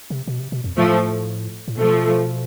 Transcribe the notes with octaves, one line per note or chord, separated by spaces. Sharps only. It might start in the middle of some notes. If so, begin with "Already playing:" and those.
C3
B2
C3
B2
F2
A2 F3 A3
A2
B2 F3 A3